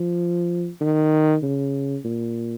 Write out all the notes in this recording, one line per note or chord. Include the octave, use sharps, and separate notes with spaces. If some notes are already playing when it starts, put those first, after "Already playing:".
Already playing: F3
D#3
C#3
A#2